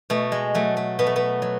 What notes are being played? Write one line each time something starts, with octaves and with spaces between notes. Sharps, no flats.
B2 A3
G#3
F#3 A3
A3
B2 B3
A3
B3
F#3